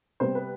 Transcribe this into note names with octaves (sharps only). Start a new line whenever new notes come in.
C3 G3 B3 C5
B4